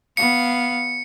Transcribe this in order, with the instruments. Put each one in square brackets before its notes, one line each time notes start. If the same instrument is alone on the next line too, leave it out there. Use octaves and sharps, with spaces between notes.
[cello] B3 F5 [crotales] C#7